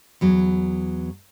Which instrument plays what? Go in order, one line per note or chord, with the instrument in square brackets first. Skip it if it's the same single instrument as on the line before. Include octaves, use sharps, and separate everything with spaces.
[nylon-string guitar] E2 F#3